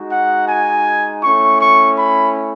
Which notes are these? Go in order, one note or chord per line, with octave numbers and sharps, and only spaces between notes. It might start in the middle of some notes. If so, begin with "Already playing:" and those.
Already playing: G#3 D#4 F#4
F#5
G#5
A3 C#4 E4 C#6
C#6
B5